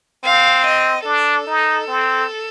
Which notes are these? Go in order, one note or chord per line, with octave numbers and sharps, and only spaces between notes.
C4 F5
D#5
D4 A4
D#4
C4